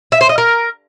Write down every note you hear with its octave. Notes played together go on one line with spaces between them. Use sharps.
E5
C5
D#5
A#4